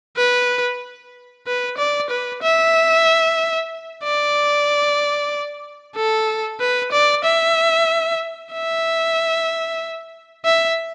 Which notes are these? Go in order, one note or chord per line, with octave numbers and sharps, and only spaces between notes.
B4
B4
D5
B4
E5
D5
A4
B4
D5
E5
E5
E5